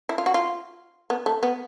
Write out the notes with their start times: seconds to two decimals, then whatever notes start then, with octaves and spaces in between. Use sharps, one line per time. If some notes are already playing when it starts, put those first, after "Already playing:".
0.09 E4
0.18 F4
0.26 F#4
0.34 F4
1.10 B3
1.26 A3
1.43 B3